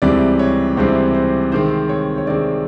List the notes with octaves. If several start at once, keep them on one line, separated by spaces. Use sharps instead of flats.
C#2 C3 E3 G3 C4 D5
C#5
C#2 C3 E3 G3 C4 C5
C5
C3 D#3 G#3 C4 C5
C#5
C#5
C3 D#3 G#3 C4 D5